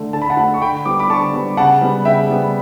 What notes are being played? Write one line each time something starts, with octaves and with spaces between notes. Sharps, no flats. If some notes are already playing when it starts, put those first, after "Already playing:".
Already playing: D3 A3
D3 A5
B5
F#5 A5
A3
C#6
D3 G5 B5
G3 B3 D6
B5 D6
D3 A5 C#6
G3 B3
C#3 F#5 A5
G3 B3
C#3 E5 G5
G3 B3